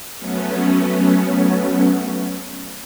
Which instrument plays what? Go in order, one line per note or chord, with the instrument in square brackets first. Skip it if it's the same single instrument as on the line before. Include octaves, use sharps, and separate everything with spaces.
[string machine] F#3 A3 B3 C#4